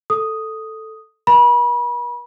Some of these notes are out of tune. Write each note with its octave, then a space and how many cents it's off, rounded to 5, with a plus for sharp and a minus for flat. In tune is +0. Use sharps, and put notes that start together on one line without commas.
A4 +0 D#6 +0
A#4 +45 B5 -35